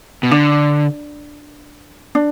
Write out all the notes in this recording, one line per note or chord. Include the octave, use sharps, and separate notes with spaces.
B2
D3 D4
D4